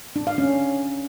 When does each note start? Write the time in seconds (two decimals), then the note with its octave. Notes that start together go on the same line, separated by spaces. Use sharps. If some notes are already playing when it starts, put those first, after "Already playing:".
0.16 D4
0.27 F5
0.38 C#4